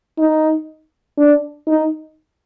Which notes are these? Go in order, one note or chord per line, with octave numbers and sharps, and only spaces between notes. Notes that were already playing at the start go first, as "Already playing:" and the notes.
D#4
D4
D#4